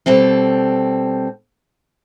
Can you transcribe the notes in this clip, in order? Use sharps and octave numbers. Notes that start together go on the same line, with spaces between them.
B2 G3 C4 A4